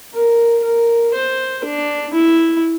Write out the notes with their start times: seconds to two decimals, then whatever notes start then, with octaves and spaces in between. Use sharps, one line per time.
0.14 A#4
0.64 A#4
1.15 C5
1.64 D4
2.14 E4